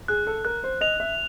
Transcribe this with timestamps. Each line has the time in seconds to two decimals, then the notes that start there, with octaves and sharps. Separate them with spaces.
0.08 G#4 F#6
0.27 A4
0.45 A#4 F#6
0.64 C5
0.81 D#5 F7
1.00 E5